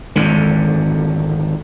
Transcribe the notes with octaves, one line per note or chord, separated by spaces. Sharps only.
G#1 F2 D3